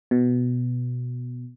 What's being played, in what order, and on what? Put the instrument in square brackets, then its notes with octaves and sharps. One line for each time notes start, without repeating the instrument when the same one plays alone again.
[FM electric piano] B2